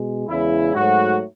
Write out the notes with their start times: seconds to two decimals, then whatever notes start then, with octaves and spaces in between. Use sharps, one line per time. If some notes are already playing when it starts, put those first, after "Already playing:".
Already playing: B2 G#3
0.29 E2 C#3 G#3 E4
0.74 G#2 F#3 A3 F#4